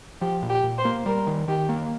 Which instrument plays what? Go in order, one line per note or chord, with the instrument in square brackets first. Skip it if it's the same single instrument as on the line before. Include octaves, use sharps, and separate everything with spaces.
[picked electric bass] F3 [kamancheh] G4
[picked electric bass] A#2
[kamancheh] G4
[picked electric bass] A#2
[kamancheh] C5
[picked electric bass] A#3
[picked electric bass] G3 [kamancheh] A#4
[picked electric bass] D#3
[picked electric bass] D#3 [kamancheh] G4
[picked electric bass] A#3